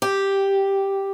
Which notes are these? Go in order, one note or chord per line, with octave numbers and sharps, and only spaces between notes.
G4